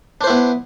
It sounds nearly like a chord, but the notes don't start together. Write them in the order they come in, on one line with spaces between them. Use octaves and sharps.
D4 C5 E4 B3